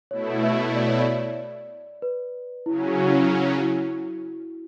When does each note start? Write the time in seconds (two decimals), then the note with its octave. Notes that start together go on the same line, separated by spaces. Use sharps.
0.11 B2 A3 E4 C#5
0.43 E5
0.75 D5
0.88 C#5
1.00 D5
2.02 B4
2.66 C#3 F#3 C#4 E4
2.87 F#4
3.08 E4
3.21 E4
3.30 F#4
3.62 E4